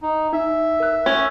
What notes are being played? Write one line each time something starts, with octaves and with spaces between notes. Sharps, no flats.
D#4
D#4 E5
A#4 F#6
C#4